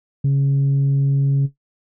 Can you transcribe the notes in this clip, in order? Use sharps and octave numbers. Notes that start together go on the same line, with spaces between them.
C#3